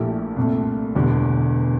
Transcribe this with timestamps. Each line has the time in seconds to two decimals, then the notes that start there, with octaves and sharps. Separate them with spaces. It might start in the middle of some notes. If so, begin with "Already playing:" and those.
Already playing: A#1 A#2 A3 E4 G4
0.36 C2 A#2 A3
0.95 E1 E2 D3 G3